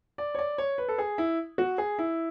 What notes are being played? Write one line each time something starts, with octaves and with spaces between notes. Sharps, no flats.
D5
C#5
D5
C#5
B4
A4
G#4
E4
F#4
G#4
E4